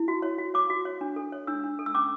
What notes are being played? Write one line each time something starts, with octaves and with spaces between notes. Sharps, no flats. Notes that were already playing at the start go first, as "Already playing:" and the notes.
Already playing: E4
F#4
C#5
F#4
C#5 D6
F#4
C#5
D4
A4
C#5
D4 E6
D4
A4
E6
C#4 D6